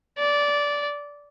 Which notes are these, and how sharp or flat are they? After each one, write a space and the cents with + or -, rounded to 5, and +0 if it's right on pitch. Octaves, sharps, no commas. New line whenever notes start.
D5 -15